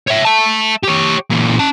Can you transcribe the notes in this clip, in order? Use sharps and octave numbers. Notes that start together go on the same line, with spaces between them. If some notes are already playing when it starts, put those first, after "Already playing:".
C#5 E5
E5 A5
G4 C#5
A#2 E3
C#4 A5